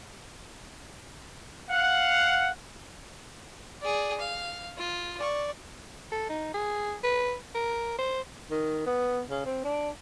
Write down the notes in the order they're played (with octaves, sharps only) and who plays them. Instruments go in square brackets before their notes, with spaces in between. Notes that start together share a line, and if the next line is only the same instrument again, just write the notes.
[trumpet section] F5 F#5
[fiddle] G#4 D5
F5
F4
D5 C#6
[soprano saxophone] A4
D#4
G#4
B4
A#4
C5
[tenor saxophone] D#3
B3
C#3
C4
D4